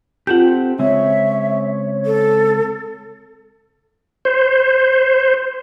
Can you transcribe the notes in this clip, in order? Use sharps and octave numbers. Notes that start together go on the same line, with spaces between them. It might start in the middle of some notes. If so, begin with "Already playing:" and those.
C4 F4 G4 A4 F#5 G6
C#3 G#3 C4 C#5 E5
A4
C5